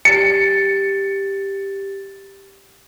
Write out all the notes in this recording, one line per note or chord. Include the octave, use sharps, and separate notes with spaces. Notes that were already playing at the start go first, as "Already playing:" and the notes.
G4 A6 C#7